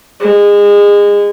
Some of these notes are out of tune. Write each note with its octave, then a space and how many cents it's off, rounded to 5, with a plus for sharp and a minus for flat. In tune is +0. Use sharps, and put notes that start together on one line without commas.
G#3 -25